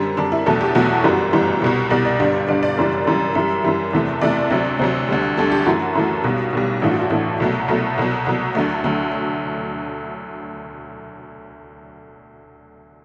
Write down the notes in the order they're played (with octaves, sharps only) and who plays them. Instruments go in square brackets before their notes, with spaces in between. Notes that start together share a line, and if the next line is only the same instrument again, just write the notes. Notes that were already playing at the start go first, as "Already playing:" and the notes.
Already playing: [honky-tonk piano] F#2 D3 G3 C4
F#2 D3 G3 D4
E4
E2 B2 F#3 A3 A4
G4
E2 B2 F#3 A3 F#4
G1 F#2 E3 G3
G1 F#2 E3 G3
C2 B2 G3
C2 B2 G3 D5
D5
G1 G2 D3 G3
G1 G2 D3 G3 D5
D5
F#1 F#2 E3 G3
F#1 F#2 E3 G3
F#2 E3 G3 E5
F#2 E3 G3
E2 C3 E3 A3
E2 C3 E3 A3 D5
D2 C3 F#3
D2 C3 F#3 C5
D2 D3 G3
D2 D3 G3 A4
G4
F#2 E3 A3 F#4
F#2 E3 A3
B1 B2 G3
B1 B2 G3
A1 G2 E3 A3
F#4
F#4
A1 G2 E3 A3
C2 B2 F#3 A3
C2 B2 F#3 A3 A4
C2 B2 F#3
C2 B2 F#3
D2 D3 F#3 A3
D2 D3 F#3 A3